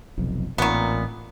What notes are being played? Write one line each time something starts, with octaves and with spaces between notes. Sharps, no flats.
F1 B1 F2
A1 A#2 D#3 B3 C4